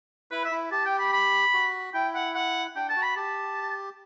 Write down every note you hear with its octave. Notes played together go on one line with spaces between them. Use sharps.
E4 B4
E5
E4
G4 A5
G5
B5
B5
F#4
E4 G5
F#5
F#5
D4 G5
A5
F#4
B5
G4 A5